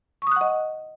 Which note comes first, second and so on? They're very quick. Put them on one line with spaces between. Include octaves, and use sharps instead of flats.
C#6 D#6 F#6 F#5 D#5